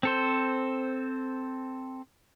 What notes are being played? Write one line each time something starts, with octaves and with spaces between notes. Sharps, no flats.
C4 A4 C5